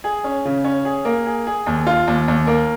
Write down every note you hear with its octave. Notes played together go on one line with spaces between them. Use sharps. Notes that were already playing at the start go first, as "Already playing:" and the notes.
G#4
C#4
C#3
C#4
G#4
A#3
G#4
G#4
D#2
F4
D#2
D#2
A#3